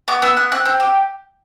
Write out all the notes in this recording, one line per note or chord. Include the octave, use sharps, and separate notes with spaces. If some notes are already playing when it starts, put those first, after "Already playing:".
B3 D6
B3 E6
B3 F#6
C4 F#6
C4
G4